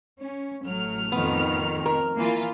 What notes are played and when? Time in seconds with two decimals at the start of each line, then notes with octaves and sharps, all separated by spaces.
0.19 C#4
0.64 A1 F#3 A3 F6
1.12 F2 D#3 F3 B3
1.86 A#4
2.19 E3 A#3 F4